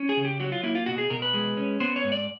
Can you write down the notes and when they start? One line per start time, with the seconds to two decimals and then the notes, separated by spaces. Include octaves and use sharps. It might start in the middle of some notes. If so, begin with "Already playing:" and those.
Already playing: C#4
0.09 G#4
0.17 C#3
0.25 G4
0.40 F#3 F#4
0.52 F4
0.63 A#3 E4
0.75 F4
0.86 B2 F#4
0.98 G#4
1.10 B2 A#4
1.22 B4
1.34 G#3
1.57 C#4
1.80 B3 C5
1.96 C#5
2.04 G#2
2.12 D5